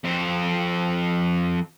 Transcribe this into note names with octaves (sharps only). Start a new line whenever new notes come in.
F2 C4